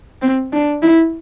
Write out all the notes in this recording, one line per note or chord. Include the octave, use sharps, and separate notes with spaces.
C4
D4
E4